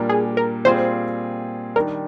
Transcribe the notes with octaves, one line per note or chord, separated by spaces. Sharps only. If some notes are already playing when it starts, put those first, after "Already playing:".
Already playing: A#2 G3 D4 A#4
G#4
A#4
A#2 G3 C4 F4 G#4 C5
D#3 G3 D4 A#4